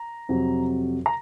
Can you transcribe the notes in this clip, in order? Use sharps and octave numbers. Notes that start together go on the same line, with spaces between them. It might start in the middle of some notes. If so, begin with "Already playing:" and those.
Already playing: A#5
F2 C3 F#3
A#5